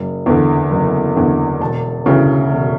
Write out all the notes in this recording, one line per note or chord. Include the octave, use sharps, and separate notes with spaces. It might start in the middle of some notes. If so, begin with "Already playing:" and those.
Already playing: F#1
E2 D3
F#1
E2 D3
E1 A5
D2 C#3 E3
E1